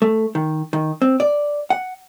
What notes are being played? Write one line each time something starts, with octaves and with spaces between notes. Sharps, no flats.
A3
D#3
D#3
C4
D5
F#5